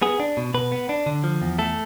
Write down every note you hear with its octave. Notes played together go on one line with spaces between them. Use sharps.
B3 G#4
D4
B2
B2 B4
B3
D4
D3
F3
E2
A3 A4